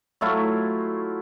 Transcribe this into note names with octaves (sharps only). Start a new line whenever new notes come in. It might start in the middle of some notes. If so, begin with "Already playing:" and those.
F#3 A3 E4 F4